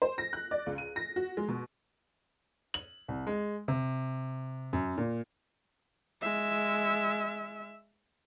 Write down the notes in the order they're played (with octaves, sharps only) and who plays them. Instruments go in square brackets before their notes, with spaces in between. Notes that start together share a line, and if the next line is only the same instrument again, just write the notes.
[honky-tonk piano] C5
A#6
F#6
D5
C#2
D#7
A#6
F#4
G#3
B2
[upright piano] F#7
C2
G#3
C3
F#2
A#2
[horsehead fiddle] G#3 E5